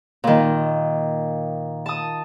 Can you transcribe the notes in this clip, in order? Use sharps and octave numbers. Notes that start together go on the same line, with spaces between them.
A#2 D#3
A5 D#6